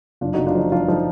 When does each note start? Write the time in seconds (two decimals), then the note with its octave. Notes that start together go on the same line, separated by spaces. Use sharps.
0.21 F#1 D4 F4
0.34 F#1 D#4 F#4
0.46 D4 F4
0.55 F3 D#4
0.72 F3 D4 F4
0.88 F3 D#4